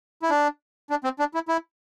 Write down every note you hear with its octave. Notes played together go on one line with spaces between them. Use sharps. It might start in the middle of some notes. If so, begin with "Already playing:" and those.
E4
D4
D4
C4
D4
E4
E4